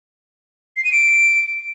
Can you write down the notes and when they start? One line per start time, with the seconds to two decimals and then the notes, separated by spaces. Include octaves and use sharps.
0.77 C7
0.85 D#7
0.92 D7